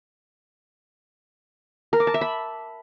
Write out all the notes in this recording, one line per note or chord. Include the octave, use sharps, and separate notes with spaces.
A#4
D6
A5
E5
B5